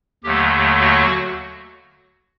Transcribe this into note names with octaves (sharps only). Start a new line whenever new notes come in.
D#2 D3 F#3 A3 G4
F#4